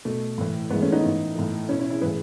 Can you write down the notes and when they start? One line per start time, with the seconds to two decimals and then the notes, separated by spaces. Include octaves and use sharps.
0.05 B2 A3
0.38 A2 E3
0.70 A2 E3 G#3 B3
0.82 A3 C#4
0.92 B3 D#4
1.03 A2 E3
1.36 A2 E3
1.69 B2 C#4 E4
1.79 C#4 E4
1.90 E4 G#4
2.01 A2 E3 G#4 B4